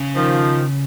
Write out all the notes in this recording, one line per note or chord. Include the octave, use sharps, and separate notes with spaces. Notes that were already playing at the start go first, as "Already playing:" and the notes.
Already playing: C#3
D#3 F3